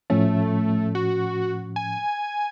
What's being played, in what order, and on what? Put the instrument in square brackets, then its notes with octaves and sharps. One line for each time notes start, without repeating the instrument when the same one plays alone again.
[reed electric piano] A2 F3 C#4 [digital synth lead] A3
[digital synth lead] F#4
G#5